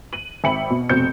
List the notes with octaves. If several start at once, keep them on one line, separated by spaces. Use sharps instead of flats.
D#7 F#7
G#1 E5 G5 B5 C#7 F#7
B2
F1 B2 C4 G6 C#7